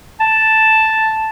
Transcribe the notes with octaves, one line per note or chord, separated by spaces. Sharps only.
A5